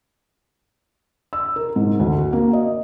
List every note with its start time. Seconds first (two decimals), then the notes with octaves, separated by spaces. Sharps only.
1.33 E6
1.56 A#4
1.76 G#2
2.00 D2
2.18 F#4
2.33 A#3
2.53 D#5